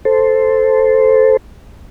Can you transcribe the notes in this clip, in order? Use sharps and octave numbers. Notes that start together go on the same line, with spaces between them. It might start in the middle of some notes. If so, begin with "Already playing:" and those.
A4 C5